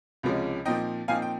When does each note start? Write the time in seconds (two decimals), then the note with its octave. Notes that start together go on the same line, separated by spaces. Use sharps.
0.23 C#2 C3 F3 G#3 C#4
0.65 A#2 F3 C4 D#4 D#5 G5
1.08 A#2 F3 C4 D#4 F5 G#5
1.22 G5